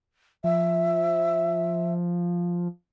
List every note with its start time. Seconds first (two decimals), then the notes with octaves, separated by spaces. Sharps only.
0.44 F3 E5